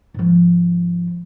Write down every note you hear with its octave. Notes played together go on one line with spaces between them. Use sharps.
G#2 F3